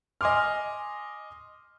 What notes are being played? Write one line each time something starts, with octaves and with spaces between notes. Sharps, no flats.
D#5 G#5 C6 D6 F6